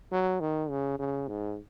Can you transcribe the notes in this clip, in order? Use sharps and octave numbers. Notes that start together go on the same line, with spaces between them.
F#3
D#3
C#3
C#3
G#2